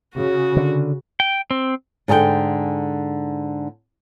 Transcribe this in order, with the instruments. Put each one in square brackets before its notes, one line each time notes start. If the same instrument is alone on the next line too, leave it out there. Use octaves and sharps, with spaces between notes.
[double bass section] C#3 [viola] F#4
[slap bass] D3
[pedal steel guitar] G5
C4
[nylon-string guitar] G#2 D3 G#4 A4 G5